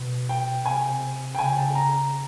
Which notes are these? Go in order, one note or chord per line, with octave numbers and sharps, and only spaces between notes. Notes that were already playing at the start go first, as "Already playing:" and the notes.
Already playing: B2
G5
C3 G#5
G5
C#3 G#5
A5
A#5